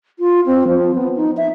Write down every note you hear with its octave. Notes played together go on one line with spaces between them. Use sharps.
F4
C4
F3
B3
D#4
E5